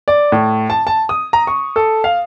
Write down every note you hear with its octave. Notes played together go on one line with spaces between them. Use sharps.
D5
A2
A5
A5
D#6
A#5
C#6
A4
F5